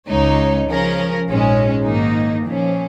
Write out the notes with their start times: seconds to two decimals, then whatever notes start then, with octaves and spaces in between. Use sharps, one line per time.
0.08 C#2 C#3 G#3 D#4 C#5
0.67 C#3 F3 C#4 A#4
1.27 A#1 G#2 G#3 C#4
1.85 G#2 D#3 A#3 D#4
2.44 A#2 F3 C#4